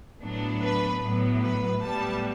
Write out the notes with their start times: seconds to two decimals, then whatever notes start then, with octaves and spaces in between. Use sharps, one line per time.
0.22 A2 F#3 B3 D4
0.62 B4
1.02 A2 F#3 B3
1.42 B4
1.81 A2 G3 B3 A5